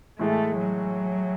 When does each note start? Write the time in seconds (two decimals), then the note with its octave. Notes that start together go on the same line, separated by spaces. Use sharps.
0.19 A2 E3 G#3 A3
0.57 F#3